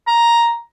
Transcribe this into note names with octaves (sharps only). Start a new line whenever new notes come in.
A#5